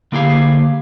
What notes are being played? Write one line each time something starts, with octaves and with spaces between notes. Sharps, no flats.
D3 A#3 E4 G4 G#4 F5